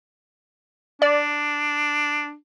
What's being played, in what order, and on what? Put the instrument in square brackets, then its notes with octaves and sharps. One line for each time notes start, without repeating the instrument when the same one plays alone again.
[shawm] D4 [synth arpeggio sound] D5